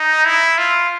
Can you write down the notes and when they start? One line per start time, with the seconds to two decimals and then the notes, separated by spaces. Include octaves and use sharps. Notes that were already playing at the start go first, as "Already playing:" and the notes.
Already playing: D#4
0.25 E4
0.58 F4